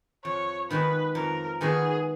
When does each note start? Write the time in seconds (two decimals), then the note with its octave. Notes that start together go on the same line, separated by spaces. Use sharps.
0.24 F2 C#5
0.70 D#3 G#3 B3 F#4 B4
1.15 F2 A#4
1.61 D#3 G#3 B3 F#4 G#4